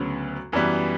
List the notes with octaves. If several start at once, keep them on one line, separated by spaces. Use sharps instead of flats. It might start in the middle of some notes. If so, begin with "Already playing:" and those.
Already playing: D2 C#3 F#3 B3
F#2 E3 G3 B3